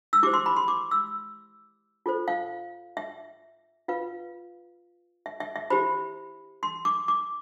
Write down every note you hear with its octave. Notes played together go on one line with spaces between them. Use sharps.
E6
E4 G4 C5 D6
C6
B5
C6
D6
E6
F4 A4 C5
F5
E5
F4 B4 F5
E5
E5
E5
E4 G4 C5 B5
C6
D6
D6